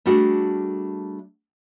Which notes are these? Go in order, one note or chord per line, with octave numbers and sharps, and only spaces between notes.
G3 A3 D4 F#4 G#4 A4